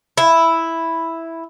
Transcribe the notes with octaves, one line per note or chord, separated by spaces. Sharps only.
E4